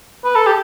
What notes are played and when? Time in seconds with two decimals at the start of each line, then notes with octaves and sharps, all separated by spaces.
0.24 B4
0.36 A4
0.47 G4